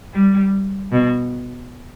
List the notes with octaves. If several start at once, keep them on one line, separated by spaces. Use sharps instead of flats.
G3
B2